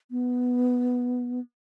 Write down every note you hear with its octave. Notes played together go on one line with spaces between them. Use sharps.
B3